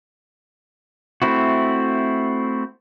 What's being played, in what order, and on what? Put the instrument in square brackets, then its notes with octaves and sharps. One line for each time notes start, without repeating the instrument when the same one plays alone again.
[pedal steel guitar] A3 C4 E4 F#4